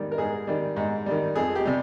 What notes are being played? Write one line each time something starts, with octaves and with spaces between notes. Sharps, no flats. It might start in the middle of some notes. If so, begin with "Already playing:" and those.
Already playing: G#2 D#3 G3
A#4
G#2 G#4
D#3 G3
G#2
D#3 G3
F2 G#4
G4
C3 G3